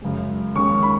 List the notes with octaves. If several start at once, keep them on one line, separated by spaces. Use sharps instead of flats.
F#2 C#3 G#3
D#2 D#3 G#3 C#4 C#6
B5